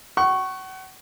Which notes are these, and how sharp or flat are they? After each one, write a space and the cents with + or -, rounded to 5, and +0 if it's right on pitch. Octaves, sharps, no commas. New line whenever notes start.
F#5 +35 C#6 -5